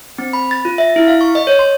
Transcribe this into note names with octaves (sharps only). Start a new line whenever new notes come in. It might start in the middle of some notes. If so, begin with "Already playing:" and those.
C4
B5
A6
F4
E5
E4
F5
C#6
D#5
C#5
C6